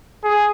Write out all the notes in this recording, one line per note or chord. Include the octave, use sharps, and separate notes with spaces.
G#4